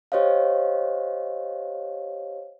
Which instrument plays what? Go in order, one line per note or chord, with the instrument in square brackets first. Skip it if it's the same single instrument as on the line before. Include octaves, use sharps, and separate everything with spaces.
[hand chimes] G4 C5 C#5 D#5 F5